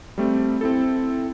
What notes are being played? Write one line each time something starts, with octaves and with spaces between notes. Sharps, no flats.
G3 A3 C4
C4 E4 A4